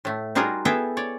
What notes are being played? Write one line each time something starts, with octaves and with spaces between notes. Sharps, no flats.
A2 A3
G3 D#4 F4 F#4 G#4 A#4
B3 E4 G#4 A4 E5 G5
C#5 D5